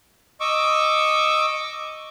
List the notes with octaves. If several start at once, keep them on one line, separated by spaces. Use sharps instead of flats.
D#5 C#6 D6 E6